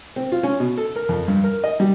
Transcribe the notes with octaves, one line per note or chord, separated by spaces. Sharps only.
C4
F4
C#4
B2
A4
A#4
F2
G2
A#4
D#5
G3